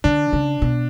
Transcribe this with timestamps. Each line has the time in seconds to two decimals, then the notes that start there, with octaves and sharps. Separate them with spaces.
0.04 D3 D4
0.33 C#3
0.62 B2